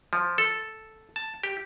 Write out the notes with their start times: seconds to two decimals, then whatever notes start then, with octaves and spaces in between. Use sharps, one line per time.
0.13 F3
0.38 A4
1.16 A5
1.44 G4